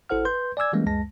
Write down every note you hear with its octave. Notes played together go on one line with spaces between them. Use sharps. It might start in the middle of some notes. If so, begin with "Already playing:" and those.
G#1 E4 A4 C5 F#5 F6
B4 C6 G6
D5 G#5 D6 E6 G#6
E3 G3 G#3 A#3 C#4
C#2 F#2 G#3 A5 A#6